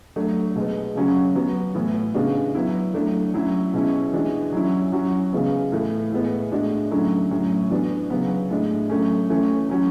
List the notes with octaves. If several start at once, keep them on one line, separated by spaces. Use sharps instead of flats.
F#3 A3 D4
B2 G#3 B3
C#3 F#3 C#4 F#4
F#3 B3 F#4
A2 E3 B3 E4
C#3 G#3 B3 D4 F#4
F#3 B3 E4
F#3 A3 D4
F#3 C#4 E4
B2 G#3 C#4 E4
E3 G#3 D4 F#4
F#3 C#4 E4
F#3 C#4 F#4
C#3 E3 G#3 B3
A2 E3 A3
A2 G#3 B3
A2 G#3 D4 F#4
D3 F#3 A3 C#4 E4
A2 F#3 C#4 F#4
E3 B3 D4 F#4
C#3 F#3 B3
A2 G#3 D4
F#3 A3 C#4
E3 A3 C#4
F#3 C#4 F#4